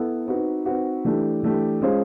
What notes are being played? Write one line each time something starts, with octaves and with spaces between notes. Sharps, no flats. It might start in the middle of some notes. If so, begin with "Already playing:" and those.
Already playing: B3 E4 A4
C4 D#4 F#4 B4
C4 D#4 F#4 B4
E3 A3 D4 G4
E3 A3 D4 G4
G#3 C#4 F4 G#4 C5